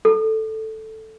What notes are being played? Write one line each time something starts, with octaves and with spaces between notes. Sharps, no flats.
A4